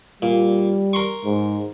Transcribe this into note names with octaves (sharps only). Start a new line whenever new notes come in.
A#2 G3
A#4 C6 C#6
G#2